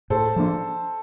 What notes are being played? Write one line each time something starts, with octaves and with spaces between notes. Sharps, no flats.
A2 A4 C5
F3 A#3 D4